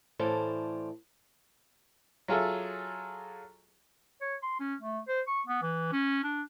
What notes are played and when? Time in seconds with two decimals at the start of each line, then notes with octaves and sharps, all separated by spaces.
0.19 A2 E3 A4 C5 D5 F5
2.28 F#3 F4 G#4 A4 E5
4.21 C#5
4.43 C6
4.60 C#4
4.81 A3
5.08 C5
5.27 C#6
5.47 B3
5.62 E3
5.92 C#4
6.24 D4